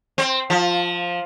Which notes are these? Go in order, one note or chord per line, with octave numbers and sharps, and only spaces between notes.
C4
F3